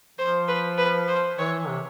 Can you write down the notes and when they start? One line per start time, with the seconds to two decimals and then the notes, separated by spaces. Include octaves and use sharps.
0.18 F3 C5
0.48 B4
0.78 B4
1.08 C5
1.38 E3 C#5
1.68 C3